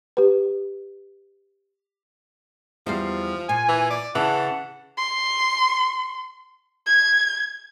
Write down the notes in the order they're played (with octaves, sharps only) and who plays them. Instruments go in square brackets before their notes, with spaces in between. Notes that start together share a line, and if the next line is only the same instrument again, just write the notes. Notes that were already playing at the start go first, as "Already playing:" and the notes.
[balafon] G4 B4
[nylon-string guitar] E2 G3 C5 [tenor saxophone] F3
[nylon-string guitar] A#2 [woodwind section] G#5
[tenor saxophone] E3
D5
[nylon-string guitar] C#3 [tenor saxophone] E3 [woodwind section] F#5 A5
[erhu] C6
G#6